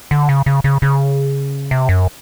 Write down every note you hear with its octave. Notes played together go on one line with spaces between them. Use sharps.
D3
C#3
C#3
C#3
C#3
C3
F#2